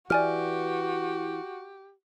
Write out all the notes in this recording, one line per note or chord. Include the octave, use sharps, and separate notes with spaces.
E3 F#4 G4 D5 G#5 F6